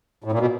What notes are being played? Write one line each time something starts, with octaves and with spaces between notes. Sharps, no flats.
A2
A#2
B2